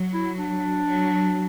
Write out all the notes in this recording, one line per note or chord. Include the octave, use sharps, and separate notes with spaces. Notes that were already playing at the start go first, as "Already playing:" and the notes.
Already playing: F#3
E4
D4
F#3